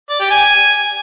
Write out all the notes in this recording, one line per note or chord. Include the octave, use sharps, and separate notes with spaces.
D5
G4
G#5